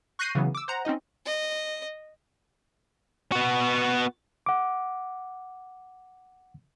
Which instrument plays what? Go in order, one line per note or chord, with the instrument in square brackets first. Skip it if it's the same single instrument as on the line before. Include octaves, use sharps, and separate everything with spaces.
[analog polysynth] C#6 F#6 G6 A#6 C7 D#7
C#3 E3 F#3 B3
D6 E6
C5 F#5 A#5
C4 C#4 D#4 D#5
[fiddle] D#5
[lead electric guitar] B3 F#4
[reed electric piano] F#5 D6